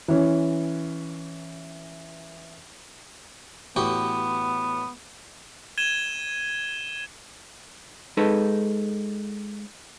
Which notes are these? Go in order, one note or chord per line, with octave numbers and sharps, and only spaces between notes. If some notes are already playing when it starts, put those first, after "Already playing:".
E3 C#4
A1 B3 F#4 G4
G#6 D#7 E7 G7
G#3 D#4 A4 B4